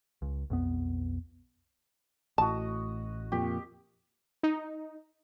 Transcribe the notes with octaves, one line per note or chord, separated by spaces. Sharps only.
C#2
B1 F2 B3
A1 A2 F#4 D#5 A5
F2 A#2 G4
D#4